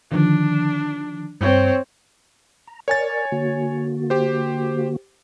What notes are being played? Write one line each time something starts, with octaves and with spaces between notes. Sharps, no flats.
D3 D#3 F3 D4
G2 C4 C#5
A#5
A#4 C#5 D5 G#5 A6
D3 A#3 F#4
G4 C5